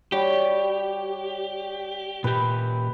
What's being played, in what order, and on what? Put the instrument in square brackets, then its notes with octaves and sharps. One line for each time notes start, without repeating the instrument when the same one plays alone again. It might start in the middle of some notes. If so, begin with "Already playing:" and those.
[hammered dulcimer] G3 F#4 C#5 [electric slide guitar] G4
[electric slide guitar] A#2 G4 [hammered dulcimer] B4